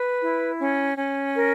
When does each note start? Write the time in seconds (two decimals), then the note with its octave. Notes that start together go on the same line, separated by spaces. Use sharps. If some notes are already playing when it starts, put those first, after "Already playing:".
Already playing: B4
0.20 E4
0.59 C#4
0.98 C#4
1.37 A#4